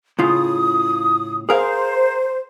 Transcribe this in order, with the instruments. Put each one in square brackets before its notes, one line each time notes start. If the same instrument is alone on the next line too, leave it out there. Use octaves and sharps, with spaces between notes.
[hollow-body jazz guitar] A2 C#3 F4 [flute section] D#6
[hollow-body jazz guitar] G#4 A#4 F5 [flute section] C5